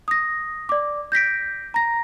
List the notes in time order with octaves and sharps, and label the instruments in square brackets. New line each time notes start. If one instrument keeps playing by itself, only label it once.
[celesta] D#6 A#6
D5 D6
G6 A#6 B6 D7
A#5 A#6